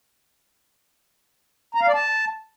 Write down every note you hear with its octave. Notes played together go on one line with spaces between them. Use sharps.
A#5
F5
D5
A5